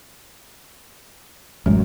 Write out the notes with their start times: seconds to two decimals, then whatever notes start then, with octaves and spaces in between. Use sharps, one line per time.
1.66 A1 F#2 G#3